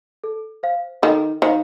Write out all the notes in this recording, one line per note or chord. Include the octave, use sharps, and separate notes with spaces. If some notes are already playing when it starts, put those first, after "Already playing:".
A4
C5 F5
D#3 A4
D#3 C5 F5